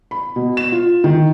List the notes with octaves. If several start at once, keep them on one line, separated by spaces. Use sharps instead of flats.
B5
B2
E7
F4
D#3